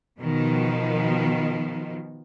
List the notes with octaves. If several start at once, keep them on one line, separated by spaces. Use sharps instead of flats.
B2 D#3 F3